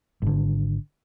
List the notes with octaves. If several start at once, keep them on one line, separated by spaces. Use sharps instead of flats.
G#1 D3